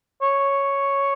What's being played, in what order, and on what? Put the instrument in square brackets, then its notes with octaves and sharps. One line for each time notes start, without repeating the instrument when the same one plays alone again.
[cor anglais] C#5